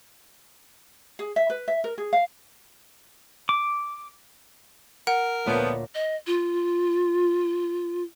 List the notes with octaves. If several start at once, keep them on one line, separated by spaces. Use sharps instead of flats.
G#4
E5
B4
E5
A#4
G#4
F5
D6
A#4 F#5
D2 A#2 F3 A3 B3 C#5
D#5
F4